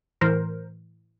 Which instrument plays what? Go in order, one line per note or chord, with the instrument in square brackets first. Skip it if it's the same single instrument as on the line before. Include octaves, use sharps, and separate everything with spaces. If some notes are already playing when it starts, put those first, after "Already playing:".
[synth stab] A2 E3 A#4 C5